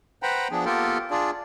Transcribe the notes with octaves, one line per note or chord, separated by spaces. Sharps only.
B4 C5 F#5 G5 A#5 B5
F3 B3 D4 G#4
A#3 B3 F4 G4 A4 A#4
D4 F4 G#4 D5